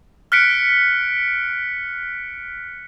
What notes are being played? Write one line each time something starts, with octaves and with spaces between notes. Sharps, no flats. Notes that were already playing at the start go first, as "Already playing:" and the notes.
F6 F#6 B6 C#7 D7